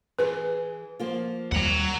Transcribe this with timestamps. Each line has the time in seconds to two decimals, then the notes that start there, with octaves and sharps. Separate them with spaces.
0.19 E3 G#4 B4
1.00 F3 A#3 F4
1.52 D#2 G3 F#5 A#5